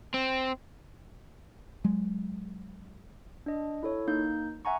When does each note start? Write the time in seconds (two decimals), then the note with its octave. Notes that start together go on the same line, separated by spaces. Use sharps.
0.14 C4
1.84 F#3 G#3
3.46 D4 D#5
3.83 E4 A4 C#5
4.07 A#3 D#4 G6
4.65 E5 F#5 G#5 A#5 C#6